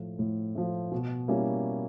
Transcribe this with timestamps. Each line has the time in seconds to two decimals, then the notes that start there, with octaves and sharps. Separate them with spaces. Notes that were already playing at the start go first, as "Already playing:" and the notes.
Already playing: A2 F3 A3
0.19 A2
0.55 F3 A3
0.92 B2
1.28 G3 A#3 C#4 E4